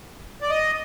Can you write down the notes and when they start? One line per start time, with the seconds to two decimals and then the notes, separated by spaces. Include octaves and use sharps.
0.42 D5
0.50 D#5